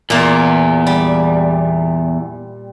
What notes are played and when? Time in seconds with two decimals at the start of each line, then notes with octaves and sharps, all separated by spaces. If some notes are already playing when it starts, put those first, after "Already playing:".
0.10 E2 A#2 A#3
0.87 G3